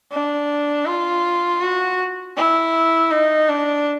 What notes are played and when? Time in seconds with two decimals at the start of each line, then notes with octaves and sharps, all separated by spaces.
0.11 D4
0.86 F4
1.61 F#4
2.37 E4
3.11 D#4
3.49 D4